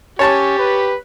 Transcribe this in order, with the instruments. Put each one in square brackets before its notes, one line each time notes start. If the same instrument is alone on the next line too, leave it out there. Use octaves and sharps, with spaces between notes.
[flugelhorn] C#4 [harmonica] G4 [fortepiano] C#5 A5 C#6
[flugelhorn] B4